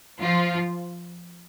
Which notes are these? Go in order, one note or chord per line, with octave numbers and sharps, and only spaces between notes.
F3 F4